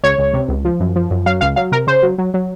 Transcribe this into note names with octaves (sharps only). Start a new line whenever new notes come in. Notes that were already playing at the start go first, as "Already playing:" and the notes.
C#2 C#5
C#2
C3
C#2
F3
F#2
F3
F#2
F#3 F5
C#2 F5
F#3 F5
C3 A#4
C#3 C5
F#3
F#3
F#3